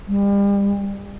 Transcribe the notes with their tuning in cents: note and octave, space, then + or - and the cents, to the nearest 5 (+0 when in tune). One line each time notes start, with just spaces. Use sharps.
G3 +35